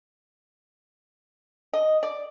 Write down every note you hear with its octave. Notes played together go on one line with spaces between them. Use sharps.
D#5
D5